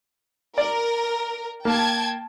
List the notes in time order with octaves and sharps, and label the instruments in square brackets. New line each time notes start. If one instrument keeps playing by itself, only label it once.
[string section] A#4 [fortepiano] D5
[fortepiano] A#3 [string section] G5 A5 G#6